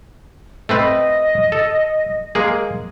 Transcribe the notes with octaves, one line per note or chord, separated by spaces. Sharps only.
A3 C4 B4 D#5
A4
G#3 A#3 G#4